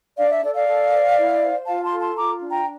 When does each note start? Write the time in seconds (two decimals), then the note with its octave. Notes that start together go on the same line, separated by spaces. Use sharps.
0.17 D4 D5 F5
0.30 E5
0.43 A4 D5
0.55 D5 F5
0.68 A4
0.93 C5
1.17 E4
1.43 C5
1.67 F4 F5 A5
1.84 A5 C6
1.92 A4
2.00 A5 C6
2.17 F4 A#5 D6
2.42 D4
2.50 G5 A#5